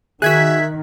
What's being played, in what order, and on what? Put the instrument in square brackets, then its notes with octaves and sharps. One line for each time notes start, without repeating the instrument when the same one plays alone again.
[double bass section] D#3 [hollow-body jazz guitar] F#4 G#4 [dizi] E5 [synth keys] F#6 G#6 B6